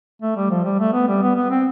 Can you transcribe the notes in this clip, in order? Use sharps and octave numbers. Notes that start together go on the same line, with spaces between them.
A3
G3
F3
G3
A3
B3
G3
B3
B3
C4